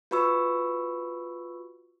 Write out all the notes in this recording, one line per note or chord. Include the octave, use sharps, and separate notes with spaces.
F4 F#4 B4 B5 C#6 E6